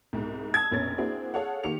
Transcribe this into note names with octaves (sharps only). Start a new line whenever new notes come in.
C2 G#2 B2
A5 D#6 E6 G#6
F1 A#1 B2 C#4 A6
A#3 C4 D4 E4 F#4 G#4
G#4 A4 C#5 F5 F#5
D#3 A#3 G4 C#7 F7